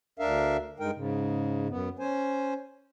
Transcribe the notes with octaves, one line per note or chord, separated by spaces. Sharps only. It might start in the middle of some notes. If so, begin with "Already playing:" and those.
D2 D4 A#4 E5 F5
G2 G#3 D#4 A#4 G5
G#2 C#3
F#2 B3
C#4 C5 G#5